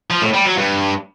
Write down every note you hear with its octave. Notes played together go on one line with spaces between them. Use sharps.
F3
A2
G3
F#3
G2